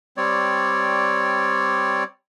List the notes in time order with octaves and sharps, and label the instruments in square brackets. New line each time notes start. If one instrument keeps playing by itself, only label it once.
[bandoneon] G3 C4 C#5 D5